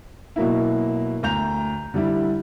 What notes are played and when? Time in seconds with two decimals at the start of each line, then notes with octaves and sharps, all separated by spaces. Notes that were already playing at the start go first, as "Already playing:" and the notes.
0.36 B2 F#3 A#3 E4
1.23 D2 A#5 G6 F7
1.94 D3 G3 D4 E4